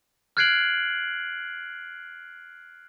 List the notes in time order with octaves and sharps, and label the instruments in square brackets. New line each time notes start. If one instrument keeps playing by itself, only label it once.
[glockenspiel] F6 F#6 G#6 C7 D7 F#7